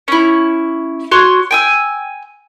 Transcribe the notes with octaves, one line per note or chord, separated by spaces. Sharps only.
C#4 E4
F#4 C#5 C6
G5 G#5 E6